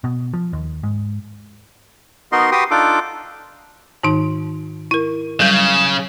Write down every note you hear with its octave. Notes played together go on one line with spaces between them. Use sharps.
B2
F3
D#2
G#2
B3 D#4 F#4 A#4 D#5 C6
F#4 G4 B4 G5 C6 D#6
D4 D#4 F4 A4 D6
G#2 D#3 D#4
E4 A#4
C#3 F#3 G3